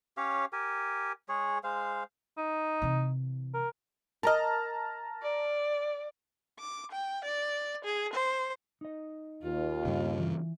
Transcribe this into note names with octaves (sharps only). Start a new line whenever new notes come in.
C#4 G4 C#5 F5
G4 A#4 G#5
G#3 G#4 C#5
G#3 C5 F5
D#4
C3 E3
A#4
A#4 D#5 A5 A#5 F6
D5
D6
G5
D5
G#4
C5
D#4 D#5
D#2 F4
G2 C#3
E3